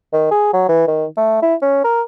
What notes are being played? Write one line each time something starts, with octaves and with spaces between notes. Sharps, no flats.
D#3
G#4
F#3
E3
D#3
A3
E4
C#4
A#4